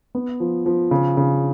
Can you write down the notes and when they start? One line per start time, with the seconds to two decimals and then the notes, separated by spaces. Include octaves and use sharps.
0.15 B3
0.40 F3
0.66 F3
0.91 C#3
1.17 C#3